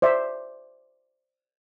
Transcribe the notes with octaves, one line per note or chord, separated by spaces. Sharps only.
C5 D5 E5